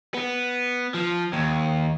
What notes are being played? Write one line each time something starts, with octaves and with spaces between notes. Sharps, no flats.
B3
F3
D#2